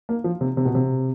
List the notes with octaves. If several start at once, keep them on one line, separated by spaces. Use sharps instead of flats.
A#3
F3
C3
C3
B2
C3